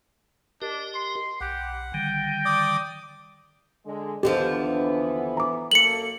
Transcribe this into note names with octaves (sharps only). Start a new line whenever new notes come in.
D4 G4 A#4 D#5
C6
B1 G4 F#5
D3 D#3 G3 G5
D5 D6 D#6
D3 G#3
D#2 D3 E3 F3 B3 G4
A#5 D6
F#2 A#3 A4 C#7 F#7